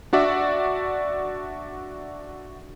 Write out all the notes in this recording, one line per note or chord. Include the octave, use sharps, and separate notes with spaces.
D4 F#4 D5 E5